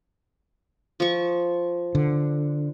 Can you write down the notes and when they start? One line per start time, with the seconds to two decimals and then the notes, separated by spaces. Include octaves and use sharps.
1.00 F3 C#6
1.95 D3